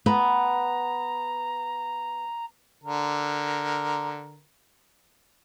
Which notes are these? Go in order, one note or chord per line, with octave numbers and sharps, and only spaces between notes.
B3 A#5
D3 A#4